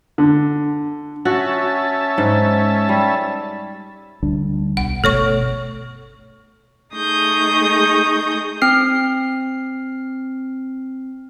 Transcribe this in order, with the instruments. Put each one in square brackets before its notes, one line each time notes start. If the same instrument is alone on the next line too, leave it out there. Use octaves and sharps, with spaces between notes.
[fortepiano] D3
[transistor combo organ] C#4 E5 A5 [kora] F#4
[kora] G#2
G3
[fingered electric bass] D2 G3 D4
[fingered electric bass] B1 [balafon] F#5
[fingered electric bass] G1 B2 A3 [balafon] A4 C#5 C#6
[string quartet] A3 D#4 G#4 C#6 D#6 G6
[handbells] C4 F6 C7